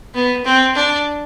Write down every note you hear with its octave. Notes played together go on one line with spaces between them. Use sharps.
B3
C4
D4